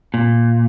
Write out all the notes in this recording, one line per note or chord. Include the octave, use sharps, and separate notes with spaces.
A#2